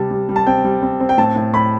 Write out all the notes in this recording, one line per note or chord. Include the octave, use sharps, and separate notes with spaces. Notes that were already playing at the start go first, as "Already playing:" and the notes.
Already playing: C3 G3 A5
G3
G3
A5
C4 G5
G3
C4
C4
G5
A2 A5
A2
A2 B5